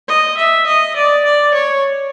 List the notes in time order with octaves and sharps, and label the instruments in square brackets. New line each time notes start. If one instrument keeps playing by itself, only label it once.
[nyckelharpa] D#5
E5
D#5
D5
D5
C#5